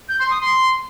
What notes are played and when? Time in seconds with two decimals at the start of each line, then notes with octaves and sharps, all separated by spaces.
0.09 G6
0.20 C6
0.30 D#6
0.41 C6